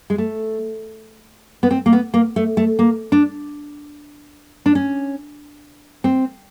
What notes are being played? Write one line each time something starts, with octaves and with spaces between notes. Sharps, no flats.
G#3
A3
B3
C4
A#3
B3
A#3
A3
A3
A#3
D4
D4
C#4
C4